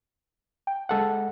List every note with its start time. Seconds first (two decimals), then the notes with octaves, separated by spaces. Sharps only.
0.67 G5
0.89 G#3 A4 F#5